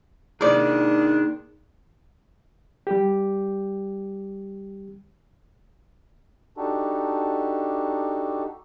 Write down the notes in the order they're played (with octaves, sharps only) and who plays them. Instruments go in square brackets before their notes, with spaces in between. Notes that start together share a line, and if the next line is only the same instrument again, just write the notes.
[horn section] D#3 D4 [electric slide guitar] A#3 D#4 G#4 [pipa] A#4 D5
[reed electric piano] G3 G4
[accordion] D4 D#4 F#4 G4 A4